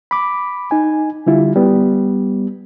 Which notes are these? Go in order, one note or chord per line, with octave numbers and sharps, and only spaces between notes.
B5 D6
D#4 G#5
D3 G3 E4 F4
G3 B3